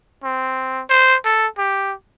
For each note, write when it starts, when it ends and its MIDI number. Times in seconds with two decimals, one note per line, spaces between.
0.24 0.82 60
0.90 1.16 72
1.25 1.47 69
1.58 1.93 67